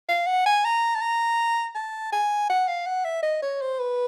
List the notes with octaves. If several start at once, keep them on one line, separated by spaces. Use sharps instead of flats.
F5
F#5
G#5
A#5
A5
A#5
A5
G#5
F#5
F5
F#5
E5
D#5
C#5
C5
B4